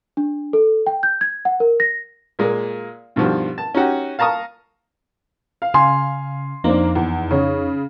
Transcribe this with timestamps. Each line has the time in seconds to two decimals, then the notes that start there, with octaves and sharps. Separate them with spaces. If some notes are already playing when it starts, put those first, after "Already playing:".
0.17 D4
0.53 A4
0.87 G5
1.03 G6
1.21 G#6
1.45 F#5
1.60 A#4
1.80 A#6
2.39 A#2 G#3 A#3
3.16 G2 B2 D#3 F3 G3
3.58 A5
3.75 C#4 D#4 F#4 G4
4.19 F5 A5 A#5 C#6 D#6
5.62 F5
5.74 C#3 G#5 C6
6.64 F2 A#3 C4 D4 D#4
6.95 E2
7.31 C#3 C#5